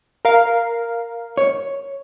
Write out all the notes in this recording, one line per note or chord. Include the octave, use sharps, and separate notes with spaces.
A#4 F5
C#5